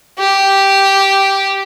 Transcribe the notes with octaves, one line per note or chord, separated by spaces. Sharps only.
G4